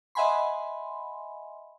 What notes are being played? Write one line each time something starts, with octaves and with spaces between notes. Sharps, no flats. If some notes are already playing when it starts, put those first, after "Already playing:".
D#5 E5 F#5 G#5 B5 C6